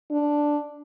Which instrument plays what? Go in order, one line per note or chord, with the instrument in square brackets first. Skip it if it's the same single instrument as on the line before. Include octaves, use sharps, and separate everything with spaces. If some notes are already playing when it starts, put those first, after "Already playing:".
[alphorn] D4